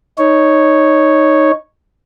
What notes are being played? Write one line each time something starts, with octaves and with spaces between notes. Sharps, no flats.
D#4 C#5